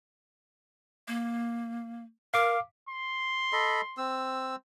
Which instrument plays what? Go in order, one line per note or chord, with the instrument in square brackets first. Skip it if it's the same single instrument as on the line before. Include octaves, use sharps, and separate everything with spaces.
[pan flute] A#3
[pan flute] A#4 [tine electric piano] F5 D6
[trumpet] C6
[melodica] A4 D#5 B5
C4 E6